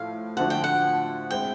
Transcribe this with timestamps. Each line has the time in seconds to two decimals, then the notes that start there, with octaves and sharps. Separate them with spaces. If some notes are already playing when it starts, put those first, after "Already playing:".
Already playing: A2 F3 A3 F5
0.37 D3 F3 A3 D4 F#4 F#5
0.50 G5
0.64 F#5
1.30 G#3 C4 E4 G5